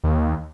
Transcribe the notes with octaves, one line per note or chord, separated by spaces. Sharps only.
D#2